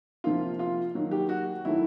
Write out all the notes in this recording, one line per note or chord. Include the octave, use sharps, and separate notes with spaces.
C3 F3 A#3 F4
F4
D#3 F#3 A#3
G4
F#4
D#3 F#3 A3 E4